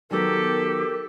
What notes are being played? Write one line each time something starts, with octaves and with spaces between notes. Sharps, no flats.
D#3 F#3 B3 G4 A4 A#4